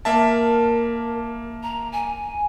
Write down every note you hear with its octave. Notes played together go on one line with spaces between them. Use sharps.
A#3 A#4 E5 A5
A#5
G#5